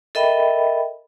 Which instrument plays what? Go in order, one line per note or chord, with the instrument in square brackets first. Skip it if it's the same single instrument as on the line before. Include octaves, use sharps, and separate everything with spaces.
[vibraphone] A4 A#4 D#5 E5 G5 B5